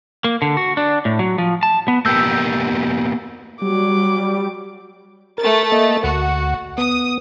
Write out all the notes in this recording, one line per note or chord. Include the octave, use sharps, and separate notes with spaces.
A#3
D3
F#4
D4
A2
F#3
F3
A5
B3
A#3 B3 G4 E6 G6
F#3 G3 D6
A3 A#4 A6
A#3 D#5
D2 F#4 F#5
B3 D#6